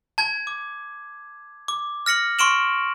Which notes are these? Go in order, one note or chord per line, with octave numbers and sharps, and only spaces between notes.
A5 G#6
D6
D6
F6 A#6 C#7 F#7
C6 C#6 F6 D7 E7 F#7